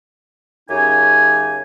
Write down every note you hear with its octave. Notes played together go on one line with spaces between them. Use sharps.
F#2 C#3 D#4 G4 G#5